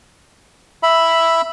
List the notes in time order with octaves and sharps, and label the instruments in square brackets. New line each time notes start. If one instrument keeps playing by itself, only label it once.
[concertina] E5 B5